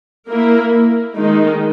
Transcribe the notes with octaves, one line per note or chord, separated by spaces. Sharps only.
A#3 E4 A#4
D#3 G#3 D#4